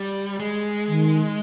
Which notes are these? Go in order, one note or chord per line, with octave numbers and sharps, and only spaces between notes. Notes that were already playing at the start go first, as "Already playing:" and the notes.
Already playing: G3
G#3
D#3